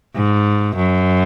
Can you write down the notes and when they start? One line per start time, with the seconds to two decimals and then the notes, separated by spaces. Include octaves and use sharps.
0.15 G#2
0.76 F#2